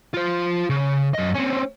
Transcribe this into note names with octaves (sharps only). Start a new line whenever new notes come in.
F4 C5
C#3
F#2 D#5
C4 C#4